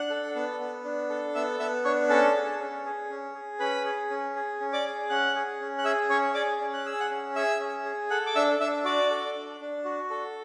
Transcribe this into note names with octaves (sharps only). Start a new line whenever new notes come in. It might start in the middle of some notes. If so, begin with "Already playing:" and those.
Already playing: D4 F#5 F#6
A4
B3
B3
D4
A4
B3 E5 E6
B3 E5 E6
D4 C#5 C#6
C#4 A4 A5
G#4
C#4
G#4
C#4
G#4
C#4 B4 B5
G#4
C#4
G#4
C#4
D5 D6
G#4
C#4 F#5 F#6
G#4
C#4
F#6
G#4 E5 E6
C#4 C#5 C#6
G#4 D5 D6
C#4
F#6
G#4 E6
F#5 F#6
C#4
G#4 E5 E6
C#4
G#4
A4 F#5 F#6
D6
D4 E5 E6
D4 E5 E6
F#4 D5 D6
A4
D4
D4
F#4
A4